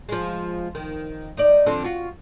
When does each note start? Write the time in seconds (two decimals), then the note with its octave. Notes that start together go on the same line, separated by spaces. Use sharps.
0.09 F3 G#3
0.75 D#3
1.37 D#4 D5
1.66 D3 F3 C4
1.84 F4 F#4